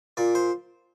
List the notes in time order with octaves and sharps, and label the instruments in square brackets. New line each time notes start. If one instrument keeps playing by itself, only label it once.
[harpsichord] A#2 D5
C5